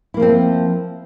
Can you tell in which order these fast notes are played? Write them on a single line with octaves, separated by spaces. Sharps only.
E4 A#3 F3 C4